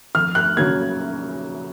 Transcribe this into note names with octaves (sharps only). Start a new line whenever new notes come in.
F2 F6
F#6
C#3 F#3 A#3 G#6